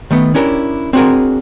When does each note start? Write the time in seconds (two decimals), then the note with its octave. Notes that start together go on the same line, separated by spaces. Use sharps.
0.11 D#3 A3 B3
0.35 C#4 D4 E4 G4 A#4
0.93 C4 D4 F#4 G#4 A#4